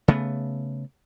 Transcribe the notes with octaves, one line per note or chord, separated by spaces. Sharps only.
C#3 A3 B3